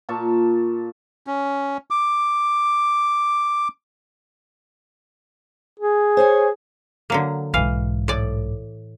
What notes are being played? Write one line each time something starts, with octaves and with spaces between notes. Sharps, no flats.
A#2 A4 A5 C#6
C#4
D6
G#4
C5 C#5 G#5
D3 F#3 A#3
B1 G#2 E3 F5
A2 D5